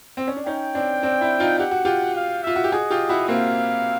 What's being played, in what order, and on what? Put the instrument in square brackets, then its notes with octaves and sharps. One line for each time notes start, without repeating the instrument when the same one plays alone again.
[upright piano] C4
C#4
D4
[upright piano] C#4 D#4 [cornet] G5
[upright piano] C4 D4
C4 D4
D4 E4
D#4 F4
[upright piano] G4 [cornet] F#5
[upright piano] F#4
F4 G4
[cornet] F5
[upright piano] F4 [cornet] E5
[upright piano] F#4
G4
[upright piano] F#4 G#4 [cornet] D#5
[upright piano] F4 G4
E4 F#4
[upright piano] A#3 C4 [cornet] F5